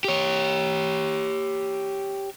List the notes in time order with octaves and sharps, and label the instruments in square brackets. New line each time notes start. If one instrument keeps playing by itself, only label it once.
[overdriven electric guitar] G4 C#5